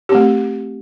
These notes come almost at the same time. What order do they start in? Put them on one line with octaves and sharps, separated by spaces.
G4 C4 A3